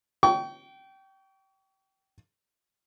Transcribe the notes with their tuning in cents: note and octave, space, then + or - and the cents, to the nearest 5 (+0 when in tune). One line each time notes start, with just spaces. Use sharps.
G5 -20 C#6 +35